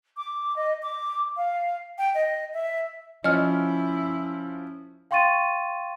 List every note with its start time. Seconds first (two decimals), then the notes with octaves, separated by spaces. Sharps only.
0.17 D6
0.56 D#5
0.83 D6
1.37 F5
1.98 G5
2.15 D#5
2.54 E5
3.24 F3 C#4 E4 D#5 F6
5.11 F5 G5 C6 C#6 A6 D#7